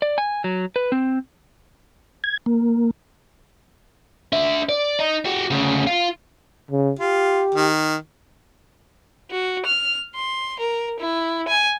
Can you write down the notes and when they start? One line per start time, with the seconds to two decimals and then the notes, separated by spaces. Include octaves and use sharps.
0.02 D5
0.18 G#5
0.44 F#3
0.76 B4
0.92 C4
2.24 G#6
2.46 A#3
4.33 D4 E5
4.69 D5
4.99 D#4
5.26 F#4 G4
5.50 D2 C#3
5.87 F4
6.71 C#3
6.99 F4 G4
7.55 D#3
9.31 F#4
9.66 F6
10.15 C6
10.59 A#4
10.99 E4
11.48 G#5